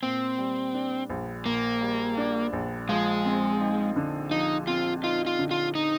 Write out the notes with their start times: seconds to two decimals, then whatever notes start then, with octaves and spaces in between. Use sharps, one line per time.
0.02 A#2 C4
0.38 G3
0.74 D4
1.10 A#1
1.46 A#2 A#3
1.81 G3
2.17 D4
2.53 A#1
2.89 F3 G#3
3.24 C4
3.60 D#4
3.96 D3
4.31 F3 D#4
4.67 C4 F4
5.03 D#4 F4
5.26 F4
5.39 D3
5.51 F4
5.75 D#4